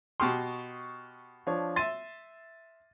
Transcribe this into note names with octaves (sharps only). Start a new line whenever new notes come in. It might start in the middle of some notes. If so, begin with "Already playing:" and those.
B2 G4 C6 C#6 D#6 F6
F3 D4 C#5
E5 C6 A6 D#7